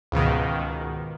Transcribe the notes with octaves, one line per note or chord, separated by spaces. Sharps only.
C#2 G#2 B2 D#3